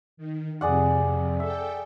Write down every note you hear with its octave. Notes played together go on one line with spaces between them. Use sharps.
D#3
F2 C3 G#4 D5 F#5
A4 E5 G5